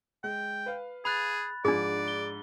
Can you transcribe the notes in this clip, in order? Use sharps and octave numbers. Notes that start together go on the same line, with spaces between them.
G#3 G5
B4 F5
G#4 B5 F#6 A6
G#2 F3 D4 G#4 D5
G7